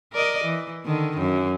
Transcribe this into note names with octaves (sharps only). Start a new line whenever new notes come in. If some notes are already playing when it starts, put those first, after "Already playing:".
A#4 D5 D#5
E3
D3 D#3
F#2